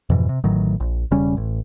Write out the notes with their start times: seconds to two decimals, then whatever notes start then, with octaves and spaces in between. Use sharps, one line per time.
0.10 F2 G#2 B2 E3
0.29 C3
0.44 A1 A2 D#3 F#3
0.80 A#1
1.11 E1 C#3 G3 C#4
1.37 A1